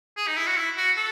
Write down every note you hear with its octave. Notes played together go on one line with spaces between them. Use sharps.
G#4
D#4
E4
F#4
E4
F#4
A4